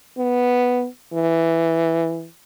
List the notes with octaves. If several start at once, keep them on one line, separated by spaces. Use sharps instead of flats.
B3
E3